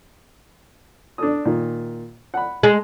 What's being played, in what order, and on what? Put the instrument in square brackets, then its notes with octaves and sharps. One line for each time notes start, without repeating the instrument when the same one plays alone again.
[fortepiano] D4 A4 D#6
A#2 D#3
F#5 B5
[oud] G#3